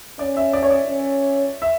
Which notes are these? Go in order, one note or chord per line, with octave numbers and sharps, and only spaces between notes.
C#4 D5
E5
D5
C#5
D5
C#4
E5